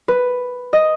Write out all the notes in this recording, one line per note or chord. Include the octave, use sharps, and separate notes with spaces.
B4
D#5